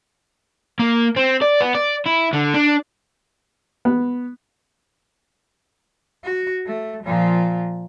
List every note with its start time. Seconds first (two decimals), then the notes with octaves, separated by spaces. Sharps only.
0.79 A#3
1.17 C4
1.42 D5
1.60 B3
1.75 D5
2.06 E4
2.33 D3
2.54 D4
3.85 B3
6.24 F#4
6.67 A3
7.04 A#2 F3